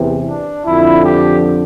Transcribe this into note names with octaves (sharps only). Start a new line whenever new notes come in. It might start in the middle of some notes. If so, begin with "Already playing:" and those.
Already playing: E2 C3 E3
D4
F2 D3 F3 E4
G4